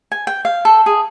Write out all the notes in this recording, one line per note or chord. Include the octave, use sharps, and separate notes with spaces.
G#5
G5
F5
A4
G#4